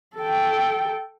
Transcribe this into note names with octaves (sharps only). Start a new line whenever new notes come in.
A4 G5